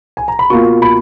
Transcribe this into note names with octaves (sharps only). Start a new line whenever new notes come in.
G#5
A#5
B5
B2 A#3 F4 C#6
B5